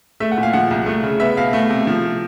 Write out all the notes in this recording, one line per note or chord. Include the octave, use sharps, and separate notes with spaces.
A3 E5
F#5
A#2
F5
F3 F#5
C2
A3
C#3
B3 E5
B2 F5
A3
C3
F3